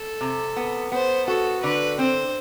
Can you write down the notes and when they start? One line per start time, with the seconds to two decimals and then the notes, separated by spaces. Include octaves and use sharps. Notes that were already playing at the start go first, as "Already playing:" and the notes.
Already playing: A4
0.21 C3
0.56 B3
0.92 B3 C5
1.27 F#4 A4
1.63 D3 B4
1.99 C4 C5